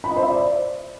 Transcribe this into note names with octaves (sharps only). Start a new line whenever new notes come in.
B5
D#5
C5
E5
D5